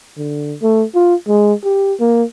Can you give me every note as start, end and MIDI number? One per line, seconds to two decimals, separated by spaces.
0.18 0.56 50
0.62 0.84 57
0.95 1.15 65
1.28 1.53 56
1.64 1.94 67
2.00 2.23 58